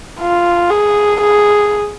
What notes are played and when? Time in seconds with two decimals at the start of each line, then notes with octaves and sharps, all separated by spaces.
0.20 F4
0.71 G#4
1.21 G#4